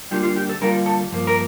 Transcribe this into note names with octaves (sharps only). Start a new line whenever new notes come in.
D3 G3 A#3 D4 F4 G4
F4
G4
A4
D3 G3 A#3 D4 F4 A#4
A4
G2 F3 A#3
A#4